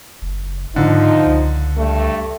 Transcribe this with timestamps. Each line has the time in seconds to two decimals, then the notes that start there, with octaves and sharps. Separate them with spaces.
0.22 F#1
0.76 G#2 D3 F3 D#4
1.26 C#2
1.76 G2 A3